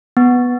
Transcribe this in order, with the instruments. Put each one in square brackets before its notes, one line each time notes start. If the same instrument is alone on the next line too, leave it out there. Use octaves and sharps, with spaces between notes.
[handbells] B3